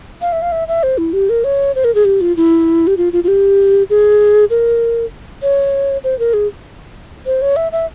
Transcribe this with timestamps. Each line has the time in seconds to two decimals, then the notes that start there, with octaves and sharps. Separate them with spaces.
0.22 F5
0.32 E5
0.42 F5
0.52 E5
0.68 E5
0.83 C5
0.98 E4
1.13 G4
1.29 A#4
1.44 C#5
1.75 C5
1.84 A#4
1.95 G#4
2.05 G4
2.21 F4
2.37 E4
2.87 G4
2.97 F4
3.13 F4
3.24 F4
3.28 G4
3.90 G#4
4.50 A#4
5.42 C#5
6.04 C5
6.19 A#4
6.33 G#4
7.26 C5
7.42 C#5
7.56 E5
7.72 E5